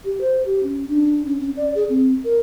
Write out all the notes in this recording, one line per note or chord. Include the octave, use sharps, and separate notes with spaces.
G4
C5
G4
C#4
D4
C#4
C#4
D5
G#4
C4
A#4